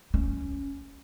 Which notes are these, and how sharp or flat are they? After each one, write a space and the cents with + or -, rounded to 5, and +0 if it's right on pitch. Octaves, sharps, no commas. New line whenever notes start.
C#4 +5